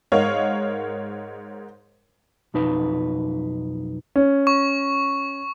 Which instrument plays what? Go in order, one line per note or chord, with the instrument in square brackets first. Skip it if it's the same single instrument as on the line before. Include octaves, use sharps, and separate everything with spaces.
[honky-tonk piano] G#2 A#4 C#5 D#5 F5 F#5
[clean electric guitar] B1 F2 D#4 B4
[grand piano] C#4
[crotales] C#6